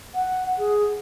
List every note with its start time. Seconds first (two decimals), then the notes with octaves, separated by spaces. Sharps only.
0.15 F#5
0.58 G#4